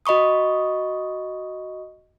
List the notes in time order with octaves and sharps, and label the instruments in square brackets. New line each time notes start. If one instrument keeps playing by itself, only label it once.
[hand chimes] F#4 D#5 B5 C#6 D#6